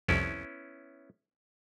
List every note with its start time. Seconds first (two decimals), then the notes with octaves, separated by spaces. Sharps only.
0.08 C2 F2 B3 C#4 E4